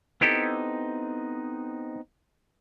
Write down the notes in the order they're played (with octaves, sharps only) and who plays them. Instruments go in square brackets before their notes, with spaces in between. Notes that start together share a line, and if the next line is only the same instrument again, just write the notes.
[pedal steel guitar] B3 C4 D#4 [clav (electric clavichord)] E4 G4 A4